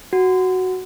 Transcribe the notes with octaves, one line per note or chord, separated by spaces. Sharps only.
F#4